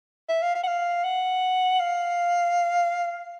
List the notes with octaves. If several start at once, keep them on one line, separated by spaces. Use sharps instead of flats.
E5
F5
F5
F#5
F5
F#5
F5